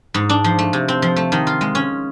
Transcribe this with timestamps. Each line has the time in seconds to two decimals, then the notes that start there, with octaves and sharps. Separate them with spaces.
0.14 G#2
0.29 D4
0.44 F3
0.59 A3
0.73 C3
0.88 C4
1.02 F3
1.16 A3
1.32 D#3
1.47 F4
1.61 G#3
1.75 C#4